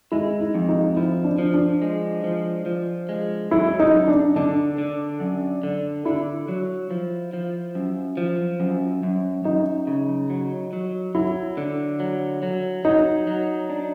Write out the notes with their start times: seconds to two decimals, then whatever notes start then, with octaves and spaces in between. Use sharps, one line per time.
0.12 G#3 E4
0.40 D#4
0.54 F2
0.69 D#4
0.97 F3 E4
1.24 D4
1.39 F3
1.54 D4
1.82 G#3
2.24 F3
2.66 F3
3.09 G#3
3.51 F#3 E4
3.80 D#4
3.94 F#2
4.08 D4
4.36 D3 D4
4.78 D3
5.20 F#2
5.63 D3
6.05 D3 E4
6.48 F#3
6.91 F3
7.33 F3
7.75 F#2
8.17 F3
8.60 F#2
9.03 F#2
9.45 F#2 D#4
9.87 C#3
10.30 F#3
10.73 F#3
11.15 F#3 E4
11.57 D3
12.00 F#3
12.43 F#3
12.85 F#3 D#4
13.27 F#3
13.70 D4